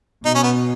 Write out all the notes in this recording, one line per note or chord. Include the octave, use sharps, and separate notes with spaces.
B2 D#4
C#4
B3